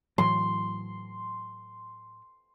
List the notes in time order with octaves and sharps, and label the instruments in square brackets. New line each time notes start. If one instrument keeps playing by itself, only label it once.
[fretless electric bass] A2 E3 F#3 [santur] C6